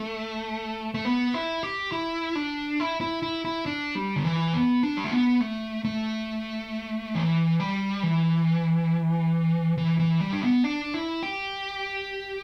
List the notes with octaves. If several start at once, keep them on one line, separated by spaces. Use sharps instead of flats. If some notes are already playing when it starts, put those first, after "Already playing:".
Already playing: A3
A3
B3
E4
G4
E4
D4
E4
E4
E4
E4
D4
G3
D3
E3
B3
D4
G3
A3
B3
A3
A3
E3
G3
E3
E3
E3
G3
D4
B3
D4
E4
G4